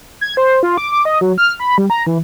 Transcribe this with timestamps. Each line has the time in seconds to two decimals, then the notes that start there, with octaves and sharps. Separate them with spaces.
0.21 G#6
0.37 C5
0.63 F4
0.78 D6
0.92 D6
1.05 D#5
1.21 F#3
1.38 F6
1.60 B5
1.78 G3
1.90 A#5
2.06 E3